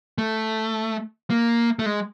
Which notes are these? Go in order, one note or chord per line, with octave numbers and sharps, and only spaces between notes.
A3
A#3
A3
G#3